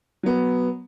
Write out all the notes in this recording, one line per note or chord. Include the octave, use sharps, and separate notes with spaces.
F#3 B3